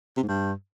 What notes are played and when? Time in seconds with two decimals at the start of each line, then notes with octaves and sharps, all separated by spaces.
0.17 C3
0.23 G#2
0.28 G2